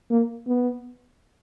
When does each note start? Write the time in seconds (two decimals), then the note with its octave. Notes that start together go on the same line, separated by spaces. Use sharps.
0.11 A#3
0.48 B3